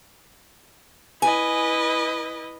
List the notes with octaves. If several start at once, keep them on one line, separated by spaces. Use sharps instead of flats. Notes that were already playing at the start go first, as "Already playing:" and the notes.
E4 B4 D#5 G#5